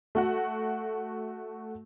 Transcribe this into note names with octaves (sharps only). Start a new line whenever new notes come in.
A3 F#4 F#5